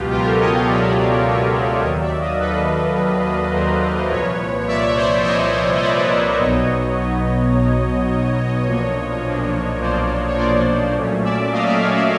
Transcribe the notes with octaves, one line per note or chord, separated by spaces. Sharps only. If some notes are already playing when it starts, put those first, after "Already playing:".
Already playing: C#2 B2 F#3 B3 F4 G4
C#2 B2 F#3 B3 F4 G4
A#4
G4 A4
C#5 D#5
D#5 F5
C#2 B2 F#3 B3 D5 E5
C#2 B2 F#3 B3
D#2 D#3 F#3 C#5 D#5
D5 E5
D#5 F5
D#2 D#3 F#3 A4 B4
D#2 D#3 F#3
D#2 D#3 F#3 A#4 C5
C2 A#2 F3 B4 C#5
C2 A#2 F3 D5 E5
C#5
C5 D5
C2 A#2 F3 C#5 D#5
D#5
C2 A#2 F3 C5 D5
B4 C#5
A#4 C5
C5 D5
B1 B2 F#3 B3 D#4 C#5 D#5
B1 B2 F#3 B3 D#4
B1 B2 F#3 B3 D#4
B1 B2 F#3 B3 D#4
B1 A#2 F3 A#3 D4 C#5 D#5
B1 A#2 F3 A#3 D4
B1 A#2 F3 A#3 D4 C5 D5
C#5
B1 A#2 F3 A#3 D4 C5 D5
A#2 F#3 A3 C#4
D5 E5
A#2 F#3 A3 C#4 D#5 F5
D5 E5
C#5 D#5
D5 E5